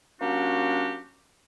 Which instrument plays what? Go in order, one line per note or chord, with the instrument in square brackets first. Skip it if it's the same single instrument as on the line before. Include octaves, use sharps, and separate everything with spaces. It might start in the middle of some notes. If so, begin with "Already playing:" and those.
[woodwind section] F#3 A#3 C#4 D4 F#4 G4